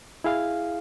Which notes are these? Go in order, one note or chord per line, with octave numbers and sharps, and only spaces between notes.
E4 G#4 F5